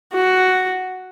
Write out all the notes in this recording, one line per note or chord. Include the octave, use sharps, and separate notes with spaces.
F#4